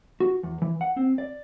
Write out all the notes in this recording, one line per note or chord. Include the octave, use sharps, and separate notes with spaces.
F#4
E2
E3
F#5
C4
D5